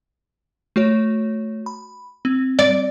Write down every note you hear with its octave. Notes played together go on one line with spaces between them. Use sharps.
A3 F#4 C#5
B5
C4
D5